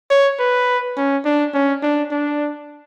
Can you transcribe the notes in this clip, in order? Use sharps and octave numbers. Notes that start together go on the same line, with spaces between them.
C#5
B4
C#4
D4
C#4
D4
D4